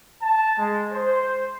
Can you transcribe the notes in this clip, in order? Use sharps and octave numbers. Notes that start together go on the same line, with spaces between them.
A5
G#3
C5